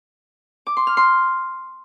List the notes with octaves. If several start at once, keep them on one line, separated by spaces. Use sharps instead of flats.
D6
C6
F6
C6